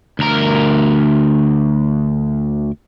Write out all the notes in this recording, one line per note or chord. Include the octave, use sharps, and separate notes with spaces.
D2 A#4